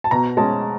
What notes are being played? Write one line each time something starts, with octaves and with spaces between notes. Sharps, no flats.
A5
B2 A#5
G#3 C#4 A5